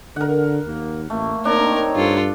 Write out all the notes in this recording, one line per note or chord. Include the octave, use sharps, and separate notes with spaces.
D3 A#4 F#5
D#2 A#3
A1 A3 A#3
A#3 C4 D4 D#4 A#4 C#5
G2 F4 A4